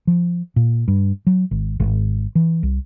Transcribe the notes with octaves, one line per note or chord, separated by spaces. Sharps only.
F3
A#2
G2
F#3
G#1
G#1
E3
C2